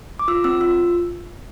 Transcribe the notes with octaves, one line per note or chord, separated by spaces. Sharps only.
D6
F4 E6
C4 E6
F4 E6